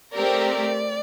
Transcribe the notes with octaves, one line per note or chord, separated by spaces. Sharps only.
A3 C4 G4 A#4 D5